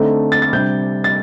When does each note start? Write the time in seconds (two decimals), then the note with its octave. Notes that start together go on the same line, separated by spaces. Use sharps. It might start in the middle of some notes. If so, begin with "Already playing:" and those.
Already playing: D3 A3 C4 D#4
0.32 A6
0.42 A6
0.53 C3 G3 D4 G6
1.04 A6